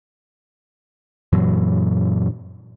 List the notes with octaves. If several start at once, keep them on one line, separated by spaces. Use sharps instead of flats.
F#2 A#2 E3 F#3